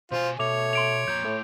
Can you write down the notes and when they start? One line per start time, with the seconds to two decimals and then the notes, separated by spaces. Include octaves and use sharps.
0.12 B2 F4 A4 C5 G#5
0.39 B2 A3 C#5 D6 F7
0.73 C6 D7 F7
1.08 F2 A#2 A#5 G6
1.24 A2 A3 E4